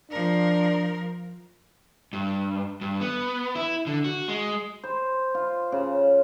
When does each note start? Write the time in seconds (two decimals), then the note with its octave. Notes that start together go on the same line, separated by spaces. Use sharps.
0.11 F3 D4 A#4
2.13 G2
2.81 G2
3.01 B3
3.55 E4
3.87 D3
4.04 F#4
4.28 G#3
4.83 C5
5.35 F4
5.72 C#3